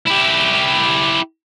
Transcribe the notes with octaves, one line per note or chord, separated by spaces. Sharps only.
E4 G4